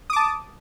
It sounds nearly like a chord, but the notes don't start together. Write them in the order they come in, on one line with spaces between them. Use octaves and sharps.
D#6 D6 A5